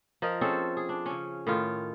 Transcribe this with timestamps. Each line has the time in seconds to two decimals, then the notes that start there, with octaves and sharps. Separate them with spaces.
0.22 F3 A#4 D#5
0.41 C4 C#4 G#4 A4
0.77 G#4
0.89 D4
1.06 C#3 C#4
1.47 A2 D#3 F4